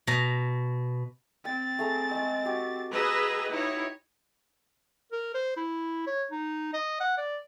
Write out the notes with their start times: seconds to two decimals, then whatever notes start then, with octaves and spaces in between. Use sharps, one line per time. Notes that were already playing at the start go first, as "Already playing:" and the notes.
0.07 B2 A#5
1.45 C4 G5 A6
1.79 A3 G#4 A#5
2.11 G#3 D#5
2.44 F#4 G4 C5
2.94 G#4 B4 D#5 A#5 E6
3.51 D#4 E4 C#5
5.12 A#4
5.34 C5
5.57 E4
6.07 C#5
6.31 D#4
6.73 D#5
7.00 F#5
7.18 D5